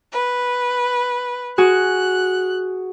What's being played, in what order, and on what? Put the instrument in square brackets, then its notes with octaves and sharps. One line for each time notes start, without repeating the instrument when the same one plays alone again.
[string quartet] B4
[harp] F#4 G#4 [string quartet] F#6